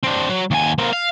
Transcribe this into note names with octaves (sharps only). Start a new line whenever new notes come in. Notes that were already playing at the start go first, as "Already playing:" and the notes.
C4 D4
F#3
D#2 G#5
A#3 C4
F5